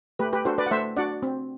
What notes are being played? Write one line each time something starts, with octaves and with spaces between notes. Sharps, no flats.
A3 G4 B4
G4 B4
D4 F#4 A4 C5
B4 D5
F#5
A3 C5 E5
D4 F#4 D5 F#5
C4